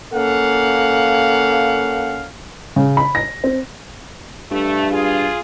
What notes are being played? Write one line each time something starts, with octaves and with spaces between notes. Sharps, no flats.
A#3 C#4 A4 F5 F#5
C#3
B5
A#6
C4
G2 A3
F4 G#4